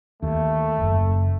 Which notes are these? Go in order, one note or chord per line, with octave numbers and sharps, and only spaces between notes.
D#2 A3
F#1